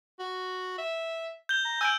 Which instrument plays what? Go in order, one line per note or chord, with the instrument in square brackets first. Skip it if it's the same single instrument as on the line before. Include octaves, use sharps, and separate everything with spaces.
[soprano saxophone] F#4
E5
[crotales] G6 G7
[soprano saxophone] A#5
[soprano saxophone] G#5 [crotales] E6 G6 D7